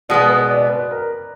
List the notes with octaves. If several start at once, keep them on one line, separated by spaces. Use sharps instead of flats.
B2 G#3 B3 D5
B4
D5
B4
A#4